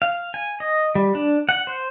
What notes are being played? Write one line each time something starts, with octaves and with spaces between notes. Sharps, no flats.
F5
G#5
D#5
G3
D4
F#5
C5